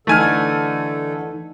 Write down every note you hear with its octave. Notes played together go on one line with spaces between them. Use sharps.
D3 E3 A3 D#4 A4 G#5 F6